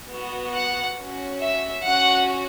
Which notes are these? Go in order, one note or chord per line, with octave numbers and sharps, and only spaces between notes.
B3 F#4
F#5
C#4 F#4
E5
C#4 F#4 F#5